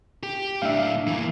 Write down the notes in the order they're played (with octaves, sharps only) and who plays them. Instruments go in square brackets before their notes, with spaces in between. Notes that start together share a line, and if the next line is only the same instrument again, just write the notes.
[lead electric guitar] G4
[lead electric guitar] A2 D4 [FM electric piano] E5 F5
[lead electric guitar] E3 A#3